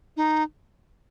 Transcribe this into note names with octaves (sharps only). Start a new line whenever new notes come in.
D#4